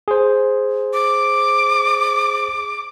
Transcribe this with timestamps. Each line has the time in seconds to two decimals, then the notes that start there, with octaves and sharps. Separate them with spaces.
0.08 G#4 C5
0.93 D6